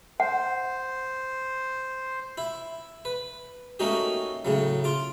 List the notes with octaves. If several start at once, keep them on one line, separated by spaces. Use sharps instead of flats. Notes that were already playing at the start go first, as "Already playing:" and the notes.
C5 F#5
E4
B4
A3 A#3 C#4 D#4 F#4 G4
A2 C#3 F#3
F4 D6